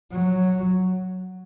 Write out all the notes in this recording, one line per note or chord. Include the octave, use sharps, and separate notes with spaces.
F#3